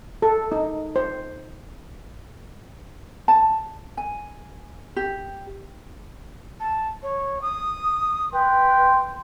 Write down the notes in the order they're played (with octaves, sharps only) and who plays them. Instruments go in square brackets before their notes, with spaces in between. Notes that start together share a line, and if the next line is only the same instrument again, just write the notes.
[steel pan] A4
D#4
C5
[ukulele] A5
G#5
G4
[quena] A5
C#5
D#6
[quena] B4 [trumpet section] G5 C6